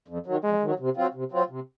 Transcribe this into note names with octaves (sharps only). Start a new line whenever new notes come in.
F2
D#3 F#3
F2 G#3
D#3 F#3
C3
F#3 C4 F4
C3
F#3 C4 F4
C3